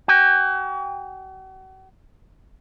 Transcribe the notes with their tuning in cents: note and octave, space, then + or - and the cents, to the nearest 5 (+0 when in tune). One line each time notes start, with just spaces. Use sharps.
F#4 +40 G5 +40